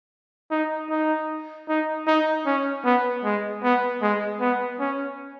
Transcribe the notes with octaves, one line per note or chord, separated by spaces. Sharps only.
D#4
D#4
D#4
D#4
C#4
B3
G#3
B3
G#3
B3
C#4